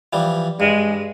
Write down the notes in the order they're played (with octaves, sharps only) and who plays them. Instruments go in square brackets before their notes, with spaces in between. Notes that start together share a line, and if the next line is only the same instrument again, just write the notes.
[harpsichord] E3 F3 G3
[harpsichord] G2 [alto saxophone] G#3